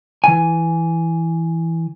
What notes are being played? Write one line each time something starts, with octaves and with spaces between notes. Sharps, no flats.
E3 G#5